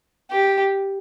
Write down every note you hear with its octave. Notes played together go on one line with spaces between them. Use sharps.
G4